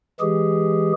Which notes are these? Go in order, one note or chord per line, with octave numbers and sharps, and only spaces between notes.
E3 G#3 G4 G#4